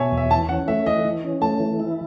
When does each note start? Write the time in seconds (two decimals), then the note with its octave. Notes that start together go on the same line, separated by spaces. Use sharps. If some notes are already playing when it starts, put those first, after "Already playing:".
Already playing: B2 C#5 E5 G#5 A5
0.12 E2
0.17 E5
0.31 E3 A5
0.49 C#4 F#5
0.68 A3 E5
0.86 E3 D#5
1.05 E3
1.24 C#4
1.41 A3 A5
1.60 E3
1.80 E4